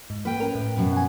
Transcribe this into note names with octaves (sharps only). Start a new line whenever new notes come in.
G#2
A#3 B4 G5
C#4 A#4
A2
F#2 B2
F#5 G#5